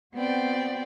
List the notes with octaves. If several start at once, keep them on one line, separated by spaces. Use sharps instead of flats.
B3 C4 F#4 C5 D5 G5